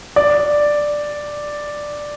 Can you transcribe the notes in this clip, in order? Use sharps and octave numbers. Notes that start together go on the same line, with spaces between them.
D5